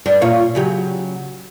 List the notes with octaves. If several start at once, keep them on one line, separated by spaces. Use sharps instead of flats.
G2 D4
A#2 F4 C#5
C#3 F#3 G4